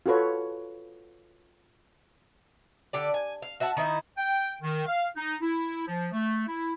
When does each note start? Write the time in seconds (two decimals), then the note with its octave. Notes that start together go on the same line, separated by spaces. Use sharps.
0.06 F4 F#4 A4 B4 C#5
2.93 D3 G4 D5
3.14 G#5
3.42 F5
3.60 F#4 E5 F#5 A5
3.77 D#3 D#4 E4
4.18 G5
4.61 D#3
4.86 F5
5.16 D#4
5.41 E4
5.88 F3
6.12 A3
6.47 E4